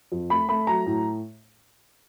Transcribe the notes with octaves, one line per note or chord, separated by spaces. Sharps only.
F2
A3 B5
A3 B5
F#3 A#5
A2